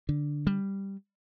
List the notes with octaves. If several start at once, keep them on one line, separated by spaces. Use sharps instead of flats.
D3
G3